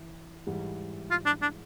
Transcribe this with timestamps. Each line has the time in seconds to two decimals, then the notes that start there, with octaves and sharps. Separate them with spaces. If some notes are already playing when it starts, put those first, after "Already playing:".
Already playing: E3
0.47 G#2 E3 G3
1.11 F4
1.26 D4
1.42 D4